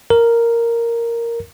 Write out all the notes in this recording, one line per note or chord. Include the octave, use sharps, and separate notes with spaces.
A#4